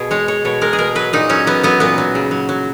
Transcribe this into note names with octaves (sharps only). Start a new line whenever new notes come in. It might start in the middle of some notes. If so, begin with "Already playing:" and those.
Already playing: B2 G#4
G#3 C#5
G#3 C#5
B2 C#5
G#3 A#4
G#4
B2 A#4
F#3 B4
A#2 D#4
F#3 C#4
F#3 B3
F#3 B3
A#2 B3
F#3
C#3
F#3
F#3